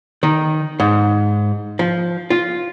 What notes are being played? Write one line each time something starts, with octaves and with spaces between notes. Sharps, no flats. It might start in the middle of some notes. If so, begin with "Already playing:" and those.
D#3
G#2
F3
F4